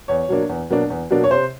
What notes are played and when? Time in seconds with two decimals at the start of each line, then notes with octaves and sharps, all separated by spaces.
0.08 E2 C#5
0.29 B2 F#3 A#3 D4
0.49 E2
0.70 B2 F#3 A#3 D4
0.90 E2
1.10 B2 F#3 A#3 D4
1.24 C#5
1.31 C3 C5